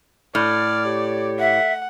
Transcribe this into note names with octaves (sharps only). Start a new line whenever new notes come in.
A2 D5 F6
G4 C#5
E5 F#5